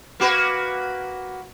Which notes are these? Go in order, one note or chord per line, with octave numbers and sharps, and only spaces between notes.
A#3 F#4 B4